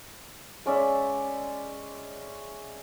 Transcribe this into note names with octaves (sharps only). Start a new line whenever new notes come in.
G#3 C#4 D5 E5